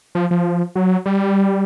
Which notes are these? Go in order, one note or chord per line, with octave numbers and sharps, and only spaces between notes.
F3
F3
F#3
G3